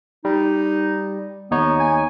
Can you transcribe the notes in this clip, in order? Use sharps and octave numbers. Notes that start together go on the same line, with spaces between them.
G3 D#4
D#2 B3 D#4 C#5
G#5